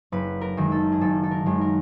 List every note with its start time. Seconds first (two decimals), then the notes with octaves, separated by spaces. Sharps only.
0.12 F#1 B4
0.41 A#4
0.57 F#2 D#3 G#3
0.72 A4
0.92 G#4
1.01 F#1 A4
1.23 A4
1.31 A#4
1.46 F#2 D#3 G#3
1.61 A#4